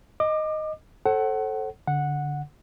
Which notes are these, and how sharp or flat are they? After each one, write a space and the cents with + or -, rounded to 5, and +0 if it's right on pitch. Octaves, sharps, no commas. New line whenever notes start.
D#5 +0 D6 +25
A4 +0 C5 +45 F#5 +25
D3 -15 F#5 -10